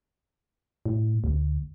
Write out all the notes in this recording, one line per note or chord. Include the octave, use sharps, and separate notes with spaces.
A2
D2